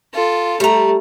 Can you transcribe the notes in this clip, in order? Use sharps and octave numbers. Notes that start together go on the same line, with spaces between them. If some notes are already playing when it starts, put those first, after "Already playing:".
F4 A4
G3 A3 A#5